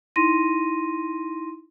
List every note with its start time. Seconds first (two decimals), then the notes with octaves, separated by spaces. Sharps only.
0.16 D#4 E4 C6 A#6 D#7